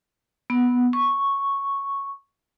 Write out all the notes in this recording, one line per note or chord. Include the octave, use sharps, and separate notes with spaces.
B3
C#6